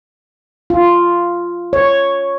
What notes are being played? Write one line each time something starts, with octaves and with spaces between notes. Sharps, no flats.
F4
C#5